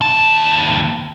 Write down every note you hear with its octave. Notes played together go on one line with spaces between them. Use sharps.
D#2 A5